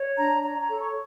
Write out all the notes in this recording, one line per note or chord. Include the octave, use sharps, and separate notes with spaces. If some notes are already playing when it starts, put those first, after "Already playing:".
Already playing: C#5
D4 A#5
C#5 A#5
A#5
A4
C#6